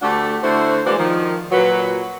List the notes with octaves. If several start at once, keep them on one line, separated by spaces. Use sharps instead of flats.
D2 A3 D4 G4 A4 F#5
D3 A3 E4 F#4 C5
E3 G#3 A#3 D4 F#4 C5
D#3 F3
A#2 F#3 B4